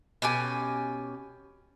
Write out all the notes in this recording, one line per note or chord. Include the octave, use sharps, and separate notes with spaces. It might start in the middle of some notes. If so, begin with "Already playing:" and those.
B2 C#4 G4 G#5